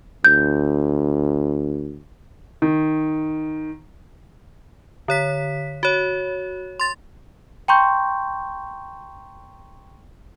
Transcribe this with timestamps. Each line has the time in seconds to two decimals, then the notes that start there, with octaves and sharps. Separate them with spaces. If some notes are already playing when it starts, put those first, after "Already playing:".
0.24 D2 G6
2.62 D#3
5.08 D3 C#5 B6
5.83 F#4 C#5
6.80 C6 A6
7.68 G5 A#5 C6 C#6 G6